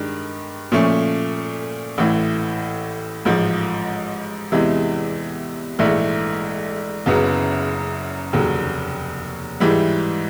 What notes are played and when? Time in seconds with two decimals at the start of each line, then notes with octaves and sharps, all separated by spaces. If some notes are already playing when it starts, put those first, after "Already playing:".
Already playing: G2 D#3 G#3 D4
0.72 A#2 F3 A3 C#4
1.98 A1 A2 E3
3.25 A1 G#2 F3
4.52 E2 C3 E3 G#3
5.79 A#1 G#2 E3 A3
7.06 F#1 F#2 C#3 F#3 B3
8.33 F1 D#2 C#3 F#3
9.60 G#2 E3 G3